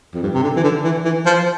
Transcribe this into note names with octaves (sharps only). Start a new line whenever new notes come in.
F2
G2
C3
D3
E3
D3
E3
E3
F3